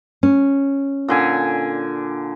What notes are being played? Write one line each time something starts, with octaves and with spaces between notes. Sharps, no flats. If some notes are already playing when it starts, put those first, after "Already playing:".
C#4
A#2 D3 G#5